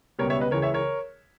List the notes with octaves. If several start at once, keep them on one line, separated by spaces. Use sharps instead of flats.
C#2 B2 G3 B3 A#4 C#5
C#5 E5
B4 D#5
C#2 C#3 E3 A#4 C#5
C#5 E5
A#4 C#5